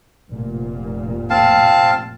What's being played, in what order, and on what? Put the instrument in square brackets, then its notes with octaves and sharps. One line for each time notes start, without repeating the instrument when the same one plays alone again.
[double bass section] F1 A#2
[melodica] C4 F5 A5